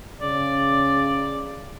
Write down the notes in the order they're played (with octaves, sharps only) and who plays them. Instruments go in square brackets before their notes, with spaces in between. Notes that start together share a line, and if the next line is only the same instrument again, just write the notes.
[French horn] C#3 [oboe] D5